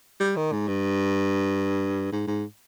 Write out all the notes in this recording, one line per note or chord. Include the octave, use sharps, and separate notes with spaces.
G3
D#3
G#2
G2
G#2
G#2